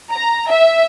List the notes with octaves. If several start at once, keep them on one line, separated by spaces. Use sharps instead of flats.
A#5
E5